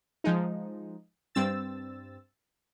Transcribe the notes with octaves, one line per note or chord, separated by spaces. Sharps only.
F3 G#3 D#4
G2 C4 E6 A6